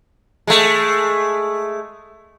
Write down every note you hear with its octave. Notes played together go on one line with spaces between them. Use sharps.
G#3 A3